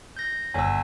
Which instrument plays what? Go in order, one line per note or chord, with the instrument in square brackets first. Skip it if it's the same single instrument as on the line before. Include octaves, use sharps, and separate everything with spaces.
[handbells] G6 A#6
[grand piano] G1 [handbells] G#5 E6